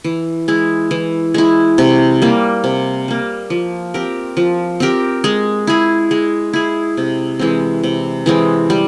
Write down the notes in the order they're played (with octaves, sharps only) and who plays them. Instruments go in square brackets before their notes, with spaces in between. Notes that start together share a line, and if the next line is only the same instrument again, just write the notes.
[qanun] E3
G#3 E4
E3
G#3 E4
C3
G3 A#3
C3
G3 A#3
F3
C4 G4 A#4
F3
C4 G4 A#4
G#3
E4 G#4
G#3
E4 G#4
C3
E3 G#3 C4
C3
E3 G#3 C4
G3